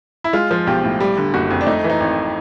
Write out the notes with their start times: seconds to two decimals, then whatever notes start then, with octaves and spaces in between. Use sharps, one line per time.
0.24 E4
0.33 G#3 F4
0.51 F3
0.67 B1 G4
0.84 A2
1.01 G3
1.18 D3
1.34 F#1 F#4
1.50 F2
1.61 D4
1.67 A3 D#4
1.84 E3
1.90 D#4
2.00 G#1